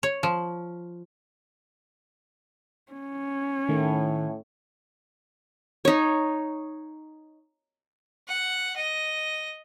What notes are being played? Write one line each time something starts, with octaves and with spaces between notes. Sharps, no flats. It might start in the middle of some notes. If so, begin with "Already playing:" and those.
C#5
F3
C#4
A2 D#3 A3
D#4 C#5
F#5
D#5